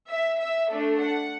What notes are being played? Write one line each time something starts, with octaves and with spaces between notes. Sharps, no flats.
E5
E5
A3 D4 A4
F#5